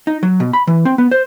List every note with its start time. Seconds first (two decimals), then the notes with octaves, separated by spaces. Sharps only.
0.07 D#4
0.23 F#3
0.40 B2
0.53 B5
0.67 E3
0.85 C4
0.98 B3
1.11 C5